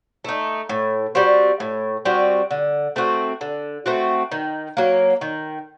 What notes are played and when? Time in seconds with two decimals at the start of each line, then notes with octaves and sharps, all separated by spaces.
0.25 A3 D#4
0.69 A2
1.15 G3 C4 F#4
1.60 A2
2.05 G3 C4 F#4
2.51 D3
2.96 A3 C4 F#4
3.41 D3
3.86 A3 C4 F#4
4.32 D#3
4.77 F#3 A#3
5.21 D#3